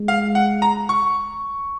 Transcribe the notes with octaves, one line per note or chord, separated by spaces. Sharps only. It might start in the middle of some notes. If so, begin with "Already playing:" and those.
Already playing: G#3
F5
F#5
A#5
C#6